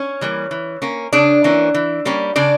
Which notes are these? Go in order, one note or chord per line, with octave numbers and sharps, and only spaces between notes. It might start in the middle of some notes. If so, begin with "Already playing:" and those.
Already playing: C#4 C#5
E3 G3 A#3
E3
A#3 C#4
C#3 D4 D5
E3 A#3 C#4
E3
G3 A#3 C#4
C#3 D4 D5